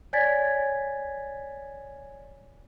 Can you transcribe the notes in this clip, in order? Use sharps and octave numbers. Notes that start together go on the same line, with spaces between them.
C#5 D5 G#5 G#6 A6 B6